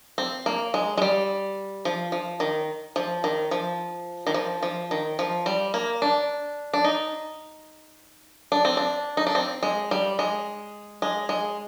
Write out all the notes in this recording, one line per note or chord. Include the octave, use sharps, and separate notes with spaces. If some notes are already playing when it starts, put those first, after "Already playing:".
C4
A#3
G#3
G#3
G3
F3
F3
D#3
F3
D#3
F3
D#3
F3
F3
D#3
F3
G3
A#3
D4
D4
D#4
D4
C4
D4
D#4
D4
C4
G#3
G3
G#3
G#3
G#3